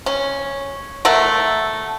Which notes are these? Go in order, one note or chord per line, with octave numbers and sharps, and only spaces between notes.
C#4
A3 A#4 E5 F#5